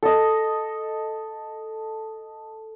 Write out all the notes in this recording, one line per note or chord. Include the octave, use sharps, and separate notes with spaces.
A4 D#5